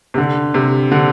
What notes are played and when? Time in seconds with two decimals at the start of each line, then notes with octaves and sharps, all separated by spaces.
0.14 C3
0.18 D3
0.54 C3
0.92 D3